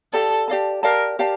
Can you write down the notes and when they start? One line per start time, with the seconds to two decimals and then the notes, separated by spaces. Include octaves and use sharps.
0.13 G4 A4 D5 F5 A5
0.48 G4 D5 F5 A5
0.83 G4 A#4 D5 F5 A5
1.19 G4 D5 F5 A5